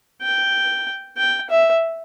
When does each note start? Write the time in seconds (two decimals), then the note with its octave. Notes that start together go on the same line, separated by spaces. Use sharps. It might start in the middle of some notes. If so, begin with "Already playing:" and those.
0.22 G5
1.18 G5
1.50 E5